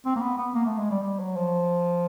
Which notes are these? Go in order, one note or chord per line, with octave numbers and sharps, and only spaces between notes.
C4
A#3
B3
B3
A#3
A3
G#3
G3
G3
F#3
F3